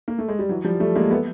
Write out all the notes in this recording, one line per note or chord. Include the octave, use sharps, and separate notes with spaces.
A#3
A3
G#3
G3
E3 F#3
F3 G3
G3 A3
G#3 A#3
A3 B3